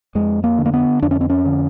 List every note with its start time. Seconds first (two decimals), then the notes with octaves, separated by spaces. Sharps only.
0.15 F2 G#3
0.44 A#3
0.58 D3
0.66 A#3
0.74 B3
1.02 F2 D4
1.11 C#4
1.21 C4
1.30 C#4
1.46 D3